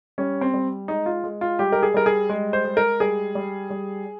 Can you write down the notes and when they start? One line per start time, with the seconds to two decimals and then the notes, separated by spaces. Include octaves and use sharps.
0.18 G3 C#4
0.41 C4
0.54 G3
0.88 G#3 D#4
1.06 F4
1.24 G#3
1.41 F4
1.59 G3 G4
1.72 A#4
1.83 G#4
1.94 G3 A#4
2.06 G#4
2.30 G#3
2.53 C5
2.65 G#3
2.77 A#4
3.00 G3 G#4
3.35 G3
3.70 G3